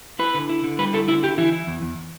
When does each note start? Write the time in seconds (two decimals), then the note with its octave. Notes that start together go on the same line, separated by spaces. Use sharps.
0.19 E4 B4
0.34 D3
0.49 E4
0.64 D3
0.79 G3 B4
0.93 E4 A4
1.08 D3 E4
1.23 E4 G4
1.38 E3 E4
1.53 E4
1.67 E2
1.82 E2